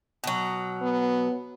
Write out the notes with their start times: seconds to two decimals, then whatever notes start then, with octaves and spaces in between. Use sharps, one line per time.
0.24 B2 F#3
0.82 B3